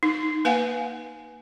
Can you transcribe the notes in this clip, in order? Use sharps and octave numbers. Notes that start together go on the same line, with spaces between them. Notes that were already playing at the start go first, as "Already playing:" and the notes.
D#4
A#3 B4 F5 F#5 G#5